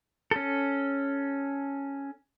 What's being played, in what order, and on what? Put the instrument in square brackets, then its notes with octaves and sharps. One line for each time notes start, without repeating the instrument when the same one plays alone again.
[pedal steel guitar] C#4 A4